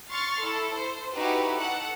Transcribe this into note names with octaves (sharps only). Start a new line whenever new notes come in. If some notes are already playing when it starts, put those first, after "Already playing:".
C6 C#6 F6 A6
E4 A4
C5
D#4 E4 F#4 G4 B4
A4 F#5